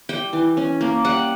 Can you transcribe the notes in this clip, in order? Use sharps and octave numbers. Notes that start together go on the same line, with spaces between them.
G3 G5
E3
C#4
A#3
G3 F#5